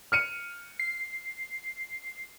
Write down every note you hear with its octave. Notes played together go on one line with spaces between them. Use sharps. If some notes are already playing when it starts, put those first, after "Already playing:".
F6 C#7 D#7
C7